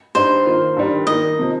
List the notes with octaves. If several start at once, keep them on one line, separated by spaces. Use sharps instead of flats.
G2 G3 D#4 C5
D#3 A#3 F4
G2 D#3 G3
D#3 A#3 D#4 D#5
C3 F3